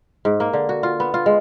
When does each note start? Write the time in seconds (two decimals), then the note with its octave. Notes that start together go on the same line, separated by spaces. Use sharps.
0.25 G#2
0.40 A#3
0.53 D3
0.69 F#4
0.83 F4
1.00 B3
1.14 F4
1.26 G#3